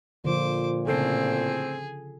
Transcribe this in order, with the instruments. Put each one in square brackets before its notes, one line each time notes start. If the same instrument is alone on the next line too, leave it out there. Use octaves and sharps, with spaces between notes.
[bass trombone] A#2 [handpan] D3 F3 F4 [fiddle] C5 D6
[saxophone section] A2 C4 [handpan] C#3 A4 [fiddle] G#4